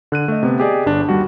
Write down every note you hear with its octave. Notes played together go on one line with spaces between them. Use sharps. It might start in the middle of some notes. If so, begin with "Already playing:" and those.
D3 F#6 D#7
A3 D#5
C3 B3
G4 G#4 D5 D#5
G1 D4
D#2 G3 F#4